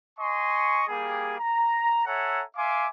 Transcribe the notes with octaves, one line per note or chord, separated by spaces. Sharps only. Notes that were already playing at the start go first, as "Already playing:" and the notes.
D#5 G#5 C6 C#6
G3 A#3 G4 G#4
A#5
A4 C#5 E5 F#5 G#5 A#5
E5 F5 G#5 C6 D6